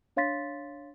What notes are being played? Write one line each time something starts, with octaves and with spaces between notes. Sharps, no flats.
D4 C#5 F5 C6 A6 B6